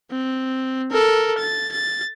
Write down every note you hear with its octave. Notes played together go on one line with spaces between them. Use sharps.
C4
A4 A#4
A6
A6